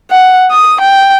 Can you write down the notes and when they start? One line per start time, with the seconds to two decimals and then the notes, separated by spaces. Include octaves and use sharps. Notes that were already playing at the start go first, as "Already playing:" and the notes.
0.11 F#5
0.51 D#6
0.81 G5